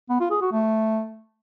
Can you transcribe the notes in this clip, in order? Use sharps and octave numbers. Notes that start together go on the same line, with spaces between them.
B3
F4
G#4
F#4
A3